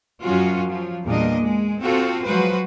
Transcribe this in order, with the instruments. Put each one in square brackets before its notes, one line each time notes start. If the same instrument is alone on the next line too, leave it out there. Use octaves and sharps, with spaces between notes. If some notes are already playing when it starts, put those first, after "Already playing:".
[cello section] F#2 F3 F#3 C#4 F4 F#4
F3 F#3
E2 A#2 G3 A#3 D4 D#5
G#3
C4 F4 F#4 A4
F3 F#3 G#3 F#4 B4 C5